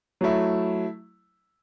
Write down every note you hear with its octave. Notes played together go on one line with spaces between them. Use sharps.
F#3 A3 E4